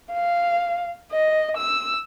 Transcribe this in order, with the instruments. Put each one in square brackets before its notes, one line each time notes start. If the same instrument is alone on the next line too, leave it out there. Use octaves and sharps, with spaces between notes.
[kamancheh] F5
D#5
E6